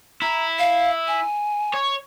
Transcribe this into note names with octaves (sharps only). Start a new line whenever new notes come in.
E4 A#5
F5
G#5
C#5